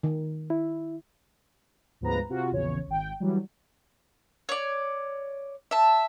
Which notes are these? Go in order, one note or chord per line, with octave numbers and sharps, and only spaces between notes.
D#3
E4
D2 G#2 F3 B3 B4 A#5
C3 F4 F#4
A#1 E2 C#3 C#5
G#1 G5
E3 F#3 G3
C#5 D5
E5 A5